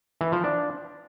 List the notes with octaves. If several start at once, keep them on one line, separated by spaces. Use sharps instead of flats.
E3
F3
D4